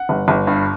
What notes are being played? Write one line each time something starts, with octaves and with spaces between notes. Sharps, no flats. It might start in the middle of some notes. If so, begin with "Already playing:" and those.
Already playing: F#5
G1
G1
G2